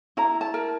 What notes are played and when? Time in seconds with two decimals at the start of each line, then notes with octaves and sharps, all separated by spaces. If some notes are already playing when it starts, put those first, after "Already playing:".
0.17 E4 A#5
0.41 A5
0.54 A#4